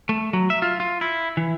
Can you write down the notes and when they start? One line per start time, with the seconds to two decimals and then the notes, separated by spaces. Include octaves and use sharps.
0.09 A3
0.33 F#3
0.50 E5
0.62 F4
0.80 F4
1.01 E4
1.37 E3